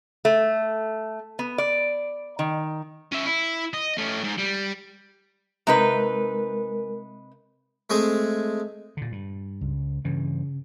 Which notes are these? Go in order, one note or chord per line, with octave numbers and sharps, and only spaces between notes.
A3
B3
D5
D#3
C#4 E5
E4
D#5
A3 C#4
G#2
G3
C3 G#3 D#4 A#4 B4
G#3 A3 C4 G#4
A#2 D3
G2
C#2
G2 C#3 E3